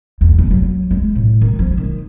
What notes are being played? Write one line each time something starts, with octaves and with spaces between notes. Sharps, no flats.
E2
F#1
F#3
G#3
A2
D#3
F3
D#3